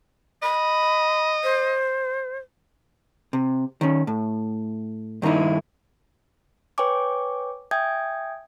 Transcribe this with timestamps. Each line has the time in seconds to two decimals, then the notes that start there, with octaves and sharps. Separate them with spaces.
0.42 D#5 B5
1.43 C5
3.33 C3
3.81 D#3 C#4
4.07 A2
5.22 G2 D#3 A#3 D#4 E4
6.78 B4 C#5 G5 G#5 C#6 D6
7.71 E5 G5 G#5 D#6 G6 G#6